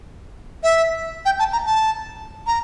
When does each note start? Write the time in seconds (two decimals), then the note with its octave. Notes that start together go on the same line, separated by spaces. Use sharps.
0.63 E5
1.26 G5
1.39 A5
1.53 A#5
1.66 A5
2.47 A#5